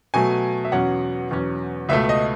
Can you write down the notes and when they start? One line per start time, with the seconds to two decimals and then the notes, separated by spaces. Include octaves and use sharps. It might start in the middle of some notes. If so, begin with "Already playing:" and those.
0.14 B2 F#3 A3 G#5
0.65 E5
0.72 E2 B2 F#3 C#4 F#5
1.31 E2 B2 F#3 C#4
1.89 C#2 B2 A3 E5
2.09 D#5